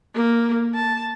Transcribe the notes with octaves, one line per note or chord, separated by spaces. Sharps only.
A#3
A5